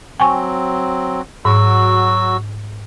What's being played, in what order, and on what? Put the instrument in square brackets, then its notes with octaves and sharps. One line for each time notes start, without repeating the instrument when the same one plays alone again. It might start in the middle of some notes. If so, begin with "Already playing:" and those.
[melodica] F#3 C4 [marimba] G5 G#5 C#6
[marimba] G#2 [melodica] F#3 F#4 E6